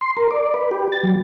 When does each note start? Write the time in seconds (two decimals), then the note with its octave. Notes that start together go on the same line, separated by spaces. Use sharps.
0.01 C6
0.17 A#4
0.31 D5
0.54 B4
0.71 G4
0.92 A6
1.03 F#3